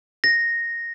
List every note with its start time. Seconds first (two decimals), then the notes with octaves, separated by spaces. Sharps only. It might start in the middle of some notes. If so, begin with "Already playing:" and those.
0.24 A#6